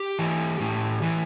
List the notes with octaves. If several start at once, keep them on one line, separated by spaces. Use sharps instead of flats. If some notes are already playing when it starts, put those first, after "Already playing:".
Already playing: G4
E3
A2
E3